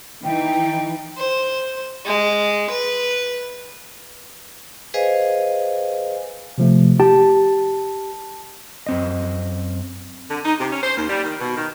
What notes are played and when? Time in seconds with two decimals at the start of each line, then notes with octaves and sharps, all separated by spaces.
0.24 E3 D#4 G5
1.17 C5
2.06 G#3
2.70 B4
4.94 G#4 B4 C5 D#5 F5 G#5
6.58 C3 F3 A3
7.00 G4 A5
8.87 F#2 C4 D#5
10.30 D3
10.45 D#4
10.59 C3
10.71 C#4
10.83 C5
10.97 D#2
11.10 G3
11.24 D#3
11.40 B2
11.57 D#3